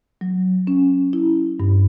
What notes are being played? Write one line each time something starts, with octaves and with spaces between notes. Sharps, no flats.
F#3
C#4
E4
G2